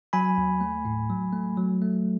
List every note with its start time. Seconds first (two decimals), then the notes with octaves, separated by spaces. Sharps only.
0.13 F#3 G#5 B5
0.38 D#2
0.61 A3
0.85 A2
1.10 F#3
1.33 A3
1.58 F#3
1.82 A3